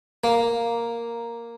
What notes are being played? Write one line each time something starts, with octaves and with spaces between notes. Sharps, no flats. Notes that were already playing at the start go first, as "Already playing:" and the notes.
A#3